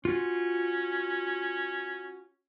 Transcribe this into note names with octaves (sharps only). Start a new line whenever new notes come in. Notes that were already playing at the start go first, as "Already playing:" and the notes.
C#4 F4 F#4